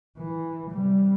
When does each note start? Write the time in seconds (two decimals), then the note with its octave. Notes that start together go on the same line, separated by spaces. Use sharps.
0.17 E3
0.71 C3 G3